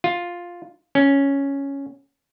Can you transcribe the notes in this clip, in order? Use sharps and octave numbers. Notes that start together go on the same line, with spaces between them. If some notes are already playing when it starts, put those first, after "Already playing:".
F4
C#4